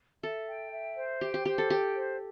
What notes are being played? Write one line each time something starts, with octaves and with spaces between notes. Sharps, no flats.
A4 E5
G5
E5
C5
G4 G5
G4
G4 C5
A4
G4 G5
C5